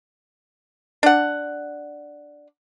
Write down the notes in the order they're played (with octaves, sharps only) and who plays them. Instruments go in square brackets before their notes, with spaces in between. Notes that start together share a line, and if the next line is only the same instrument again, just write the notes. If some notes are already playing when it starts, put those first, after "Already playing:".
[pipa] D4 F#5